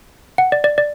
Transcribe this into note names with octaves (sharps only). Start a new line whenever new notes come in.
F#5
D5
D5
D5